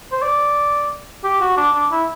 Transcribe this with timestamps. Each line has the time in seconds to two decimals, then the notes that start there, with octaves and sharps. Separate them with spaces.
0.12 C5
0.22 D5
1.24 G4
1.41 F#4
1.57 D4
1.74 D4
1.92 E4